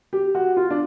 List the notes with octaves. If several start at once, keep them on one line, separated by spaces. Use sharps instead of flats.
G4
F#4
F4
D4